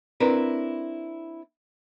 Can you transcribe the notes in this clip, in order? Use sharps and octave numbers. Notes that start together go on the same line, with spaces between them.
C4 D4 E4 A#4 B4